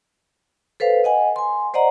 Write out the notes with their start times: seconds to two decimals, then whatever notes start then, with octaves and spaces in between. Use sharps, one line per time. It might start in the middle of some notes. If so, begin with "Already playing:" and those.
0.80 A4 B4 C5 F5
1.04 D#5 F#5 G#5
1.36 G#5 C6
1.74 C5 D5 D#5 F#5 A#5